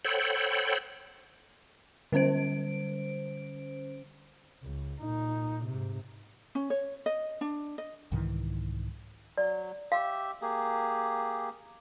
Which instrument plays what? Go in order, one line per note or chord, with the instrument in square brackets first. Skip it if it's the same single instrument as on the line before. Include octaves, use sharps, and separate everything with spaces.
[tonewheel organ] A4 C5 C#5 F#5 G5 B5
[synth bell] D3 G3 C#4 C5 D7
[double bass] C#2
A#2 D#4
G#2 C3
[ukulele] C#4
C#5
D#5
D4
D#5
[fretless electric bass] C2 G#2 D#3 E3
[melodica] F#3 [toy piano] D5
[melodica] G4 E5 [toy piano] F5
[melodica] A#3 G4 G#4